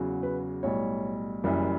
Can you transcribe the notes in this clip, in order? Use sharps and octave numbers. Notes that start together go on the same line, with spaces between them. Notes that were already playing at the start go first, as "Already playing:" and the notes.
Already playing: E2 C#3 F#3
B4
B1 A2 G3 C#5
F#1 F#2 E3 G3